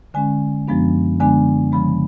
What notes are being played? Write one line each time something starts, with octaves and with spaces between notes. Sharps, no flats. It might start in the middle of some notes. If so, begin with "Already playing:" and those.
D3 G#3 C#4 G#5
F#2 F3 G#3 B3 D4
D3 G#3 B3 D4 G#5
C#3 F3 G#3 B5